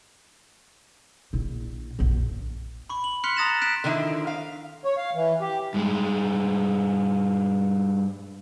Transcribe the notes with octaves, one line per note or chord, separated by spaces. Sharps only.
A#1 E4
A#1 F#2
B5 C#6
F#7
C6 F6 F#6 B6 C#7 F7
A#5 D#6 A6 A#6 E7
F#6 B6 D7 E7
D3 D#3 F3 E4
F5
C#5
F5
E3
G4
G2 G#3